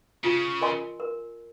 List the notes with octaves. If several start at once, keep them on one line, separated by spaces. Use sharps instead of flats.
C#3 F4
A#4 D#5 G#5 C6
A#4